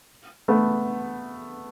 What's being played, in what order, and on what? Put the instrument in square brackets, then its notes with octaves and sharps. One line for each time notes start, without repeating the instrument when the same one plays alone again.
[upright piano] A3 B3